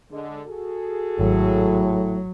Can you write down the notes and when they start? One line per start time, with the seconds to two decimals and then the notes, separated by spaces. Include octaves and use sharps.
0.11 D3 G#3
0.46 F#4 G#4 A4
1.19 G#1 A2 F#3